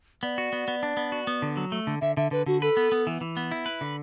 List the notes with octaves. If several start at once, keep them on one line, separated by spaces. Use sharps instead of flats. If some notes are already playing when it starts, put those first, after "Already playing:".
B3 D5
F#4
B3
B3
D4
B3
F#4
B3
D3
F#3
A3
D3
D3 E5
D3 E5
D3 B4
D3 F#4
A4 B4
B3
B3
E3
E3
B3
E4
B4
D3